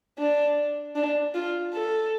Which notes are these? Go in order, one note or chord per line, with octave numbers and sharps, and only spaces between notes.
D4
D4
F4
A4